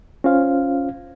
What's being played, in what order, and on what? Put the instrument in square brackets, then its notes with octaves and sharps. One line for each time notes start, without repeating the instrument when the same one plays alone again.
[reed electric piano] C#4 F4 C5 F5